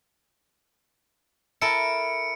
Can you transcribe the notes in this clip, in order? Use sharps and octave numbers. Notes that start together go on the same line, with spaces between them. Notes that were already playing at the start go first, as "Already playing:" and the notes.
E4 A4 A#4 C#7 D7